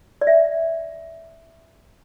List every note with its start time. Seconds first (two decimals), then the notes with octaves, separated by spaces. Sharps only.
0.21 D5
0.27 E5